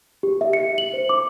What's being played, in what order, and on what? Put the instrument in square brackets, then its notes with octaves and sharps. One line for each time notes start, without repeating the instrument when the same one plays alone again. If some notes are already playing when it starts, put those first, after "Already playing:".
[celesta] G4
E5
C#7
F#7
C5
D6